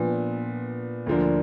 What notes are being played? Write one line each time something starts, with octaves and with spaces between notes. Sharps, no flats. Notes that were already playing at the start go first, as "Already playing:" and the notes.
Already playing: A#2 F3 B3 D4
D2 D3 F3 A#3 D4